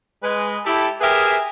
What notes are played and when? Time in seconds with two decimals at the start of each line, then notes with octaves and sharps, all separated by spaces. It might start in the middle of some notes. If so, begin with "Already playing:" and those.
0.22 G#3 B4
0.65 E4 G4 A4
1.01 G4 G#4 A#4 B4 E5